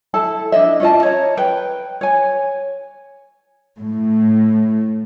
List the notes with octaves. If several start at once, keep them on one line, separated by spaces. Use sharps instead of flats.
E4 A4 A5
D4 E4 D#5 E5
C#4 F4 D#5 A5
C#5 A#5
B4 G5
C#5 G#5
A2